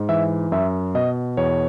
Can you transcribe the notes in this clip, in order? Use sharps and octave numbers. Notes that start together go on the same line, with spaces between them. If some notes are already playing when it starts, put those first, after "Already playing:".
Already playing: G#2
E3 E5
F#2 E5
B2 D#5
E2 C#5